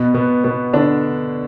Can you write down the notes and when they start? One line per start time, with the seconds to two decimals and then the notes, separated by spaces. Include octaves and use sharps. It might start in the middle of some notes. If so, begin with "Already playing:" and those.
Already playing: B2 B3
0.14 B2 B3
0.44 B2 B3
0.73 D3 D4